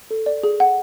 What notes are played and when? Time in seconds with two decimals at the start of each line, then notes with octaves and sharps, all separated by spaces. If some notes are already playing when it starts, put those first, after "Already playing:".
0.11 A4
0.26 D5
0.43 G#4
0.60 F#5